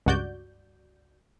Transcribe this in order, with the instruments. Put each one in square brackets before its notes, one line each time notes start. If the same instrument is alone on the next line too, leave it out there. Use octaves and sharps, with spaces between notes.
[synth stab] C#2 G2 F#4 D5 G6